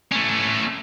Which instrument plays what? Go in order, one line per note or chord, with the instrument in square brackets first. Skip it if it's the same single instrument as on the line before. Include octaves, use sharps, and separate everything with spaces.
[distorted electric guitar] A3 C#4